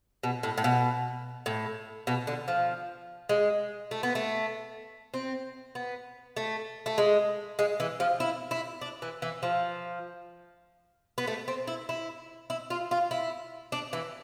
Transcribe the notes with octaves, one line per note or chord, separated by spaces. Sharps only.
B2
A2
A2
B2
A2
B2
D3
F3
G#3
A3
B3
A3
C4
B3
A3
A3
G#3
G#3
E3
F3
E4
E4
D4
E3
E3
F3
B3
A3
C4
E4
E4
E4
F4
F4
E4
D4
E3